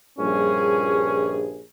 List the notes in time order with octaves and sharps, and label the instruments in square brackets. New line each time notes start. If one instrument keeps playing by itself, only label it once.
[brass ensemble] A#1 G2 G#4 [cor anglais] C#4